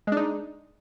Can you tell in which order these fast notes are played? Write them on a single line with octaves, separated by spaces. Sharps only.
G#3 D4 D#4